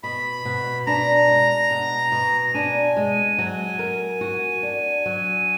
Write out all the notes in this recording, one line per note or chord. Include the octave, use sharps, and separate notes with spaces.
B2 B5
B2
D4 A#5
G#3
B2
B2
D4 G#5
G#3
F#3
A#4
F#4
D4
F#3